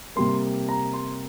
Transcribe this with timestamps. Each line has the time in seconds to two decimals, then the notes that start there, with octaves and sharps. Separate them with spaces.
0.16 C3 G3 A#3 C6
0.69 A#5
0.93 C6